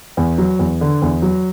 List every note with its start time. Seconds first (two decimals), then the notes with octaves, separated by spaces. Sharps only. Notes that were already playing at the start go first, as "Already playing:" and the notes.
0.17 E2
0.38 F#3
0.59 E2
0.81 D3
1.02 E2
1.22 F#3